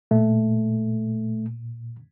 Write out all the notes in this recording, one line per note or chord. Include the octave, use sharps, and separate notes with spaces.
A#2 A3